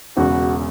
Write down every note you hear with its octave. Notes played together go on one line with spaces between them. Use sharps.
E1 E2 C#3 F#4